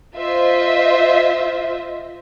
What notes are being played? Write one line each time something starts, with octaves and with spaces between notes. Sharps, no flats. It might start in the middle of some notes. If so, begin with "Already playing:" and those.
F4 C5 D#5 E5